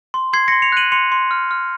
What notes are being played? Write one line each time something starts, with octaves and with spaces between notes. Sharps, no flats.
C6
C6 G#6 C7
C6 A#6 C#7
C#7 F7
F#6 D#7 F#7
C6 C#7 F7
C6
F6
F6